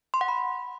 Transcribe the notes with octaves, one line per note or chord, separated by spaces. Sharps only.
C6
F#5
B5